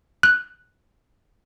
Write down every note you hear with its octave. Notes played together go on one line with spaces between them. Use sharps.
F#6